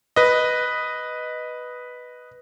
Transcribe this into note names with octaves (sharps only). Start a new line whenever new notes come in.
B4 D#5